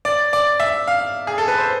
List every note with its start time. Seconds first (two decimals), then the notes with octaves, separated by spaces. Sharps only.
0.05 D5
0.33 D5
0.60 E5
0.88 F5
1.27 G#4
1.38 A4
1.48 B4
1.58 C5